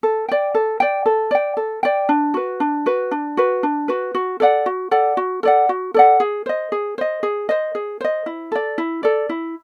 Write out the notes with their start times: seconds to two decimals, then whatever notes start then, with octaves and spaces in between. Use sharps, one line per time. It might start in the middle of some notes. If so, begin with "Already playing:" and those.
0.03 A4
0.29 D5 G5
0.55 A4
0.80 D5 G5
1.06 A4
1.31 D5 G5
1.57 A4
1.83 D5 G5
2.09 D4
2.34 F#4 B4
2.60 D4
2.86 F#4 B4
3.11 D4
3.37 F#4 B4
3.63 D4
3.88 F#4 B4
4.15 F#4
4.40 A4 D5 F#5
4.66 F#4
4.91 A4 D5 F#5
5.17 F#4
5.43 A4 D5 F#5
5.69 F#4
5.94 A4 D5 F#5
6.20 G#4
6.46 C5 D#5
6.72 G#4
6.98 C5 D#5
7.23 G#4
7.49 C5 D#5
7.75 G#4
8.01 C5 D#5
8.26 E4
8.52 A4 D5
8.78 E4
9.03 A4 D5
9.29 E4